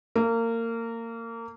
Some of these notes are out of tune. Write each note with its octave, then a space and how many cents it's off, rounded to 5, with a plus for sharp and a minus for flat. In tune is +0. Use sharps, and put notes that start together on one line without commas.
A#3 -25